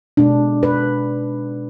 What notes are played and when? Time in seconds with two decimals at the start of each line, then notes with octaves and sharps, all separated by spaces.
0.17 B2 G#3 D4
0.63 B4